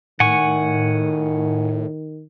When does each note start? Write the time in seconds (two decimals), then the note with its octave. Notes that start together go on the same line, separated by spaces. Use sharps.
0.20 A2 D#3 F#5 G#5 C#6